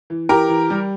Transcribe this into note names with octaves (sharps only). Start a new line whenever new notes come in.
E3
E3 G4 A#4
E3
G3